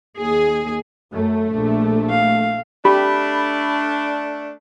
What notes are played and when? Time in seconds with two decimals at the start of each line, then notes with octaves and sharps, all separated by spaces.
0.17 D#2 G#4
1.13 F#2 A3
1.53 A#1 D4
2.10 F5
2.85 A3 D4 G4 B5